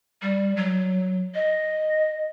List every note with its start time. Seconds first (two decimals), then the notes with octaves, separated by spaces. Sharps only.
0.22 G3
0.56 F#3
1.35 D#5